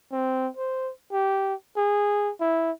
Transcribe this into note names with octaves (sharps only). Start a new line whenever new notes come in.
C4
C5
G4
G#4
E4